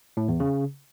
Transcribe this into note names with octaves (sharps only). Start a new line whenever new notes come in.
A2
E2
C#3